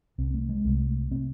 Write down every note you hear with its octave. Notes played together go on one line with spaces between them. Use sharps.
C2 C3 C4
A3
G#3
C2 C3 A3
C3 C4